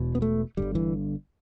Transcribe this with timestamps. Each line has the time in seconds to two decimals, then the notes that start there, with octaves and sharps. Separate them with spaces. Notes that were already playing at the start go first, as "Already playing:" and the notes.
Already playing: E1 E2 B2
0.15 B3
0.22 A3
0.57 G1 G2 D3 G3
0.75 E3